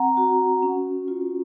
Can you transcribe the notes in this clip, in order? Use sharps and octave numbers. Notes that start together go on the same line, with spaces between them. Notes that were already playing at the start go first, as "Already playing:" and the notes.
Already playing: C4 F#5 A#5
F#4
C#4
F4